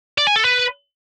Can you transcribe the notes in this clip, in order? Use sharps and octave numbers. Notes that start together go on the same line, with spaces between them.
D5
G#5
A4
B4